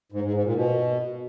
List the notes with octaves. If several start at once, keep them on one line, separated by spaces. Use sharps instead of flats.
G#2
G#2
G#2
A#2
B2